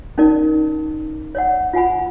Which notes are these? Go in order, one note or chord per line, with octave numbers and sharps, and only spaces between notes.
C#4 D#4 A#4 D5
C#5 D5 F#5
F4 F#5 G#5 B5